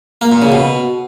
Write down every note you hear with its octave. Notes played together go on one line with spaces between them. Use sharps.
A#3
A#2
C#3
B2